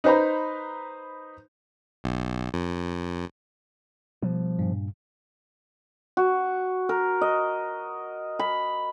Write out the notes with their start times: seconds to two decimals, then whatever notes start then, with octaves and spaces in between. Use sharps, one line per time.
0.04 D#4 B4 C5 A#5 B5
2.04 B1
2.54 F2
4.22 B2 F3 G3
4.59 G2 A#2
6.17 F#4
6.89 A#4
7.21 D#5
8.39 B5